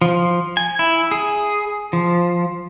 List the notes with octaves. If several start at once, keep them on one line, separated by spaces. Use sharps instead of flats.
F3
G#5
E4
G#4
F3